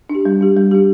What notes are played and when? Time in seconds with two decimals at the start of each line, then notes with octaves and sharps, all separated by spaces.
0.10 D4
0.15 G4
0.25 G3
0.41 D4 G4
0.57 G3
0.71 D4 G4